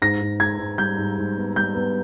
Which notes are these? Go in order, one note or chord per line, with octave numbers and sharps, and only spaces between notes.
G#2 A#6
G#2
G#2 G#6
G#2
G3 G6
G#2
G#2
B3
G3 G6
B3